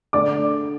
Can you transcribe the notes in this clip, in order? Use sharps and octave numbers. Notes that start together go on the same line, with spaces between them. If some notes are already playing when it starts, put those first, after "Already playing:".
D3 A3 D4 D5 D6